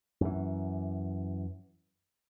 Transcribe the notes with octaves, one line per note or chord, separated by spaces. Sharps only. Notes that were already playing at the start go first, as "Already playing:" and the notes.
F#2 E3